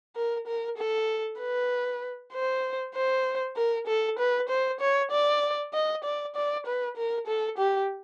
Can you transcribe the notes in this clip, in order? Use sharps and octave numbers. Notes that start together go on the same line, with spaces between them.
A#4
A#4
A4
B4
C5
C5
A#4
A4
B4
C5
C#5
D5
D#5
D5
D5
B4
A#4
A4
G4